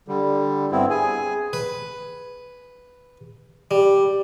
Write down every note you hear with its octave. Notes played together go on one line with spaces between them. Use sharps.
D3 G3
G2 B3 C4 E4
G#4 G#5
B4
G3